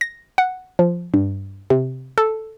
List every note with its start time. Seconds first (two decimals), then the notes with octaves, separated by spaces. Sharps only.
0.01 A#6
0.38 F#5
0.79 F3
1.14 G2
1.70 C3
2.18 A4